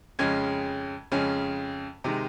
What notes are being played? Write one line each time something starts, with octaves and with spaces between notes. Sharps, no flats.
F2 C#3 G#3 C#4 G#6
F2 C#3 G#3 C#4
C3 D#3 G#3